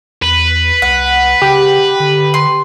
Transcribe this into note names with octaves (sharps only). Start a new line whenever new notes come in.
E2 B4
C2 F#5
C#3 G4
D3
C6